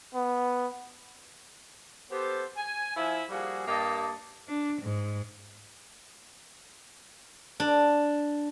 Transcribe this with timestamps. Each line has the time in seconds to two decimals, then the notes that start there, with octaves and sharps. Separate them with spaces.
0.15 B3
2.11 B3 G4 A4 C5
2.57 G#5
2.96 F3 E4 E5 G#5
3.30 F3 G3 A#3 F#4 G#4
3.67 G2 A#3 G4 D#5 A5
4.49 D4
4.82 G#2
7.60 D4